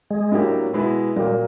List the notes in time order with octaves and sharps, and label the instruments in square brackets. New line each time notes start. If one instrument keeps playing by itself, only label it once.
[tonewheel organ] G#3
[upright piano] A2 F#3 A#3 D4 G4
B2 G#3 B3 E4
[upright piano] A#2 F#3 A#3 [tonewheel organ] G3